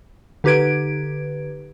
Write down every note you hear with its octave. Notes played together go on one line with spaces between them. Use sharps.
D3 D#4 G4 B4 G#6 D7